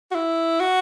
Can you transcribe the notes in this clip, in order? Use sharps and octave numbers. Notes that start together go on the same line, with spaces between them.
F#4
E4
F#4